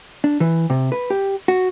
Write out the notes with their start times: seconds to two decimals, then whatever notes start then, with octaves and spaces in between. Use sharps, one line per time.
0.24 D4
0.40 E3
0.70 C3
0.92 B4
1.10 G4
1.48 F#4